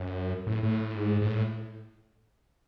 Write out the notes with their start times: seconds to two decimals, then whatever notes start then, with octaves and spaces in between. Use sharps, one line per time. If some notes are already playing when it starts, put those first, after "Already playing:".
Already playing: F#2
0.47 A2
0.63 A2
0.95 G#2
1.22 G#2
1.26 A2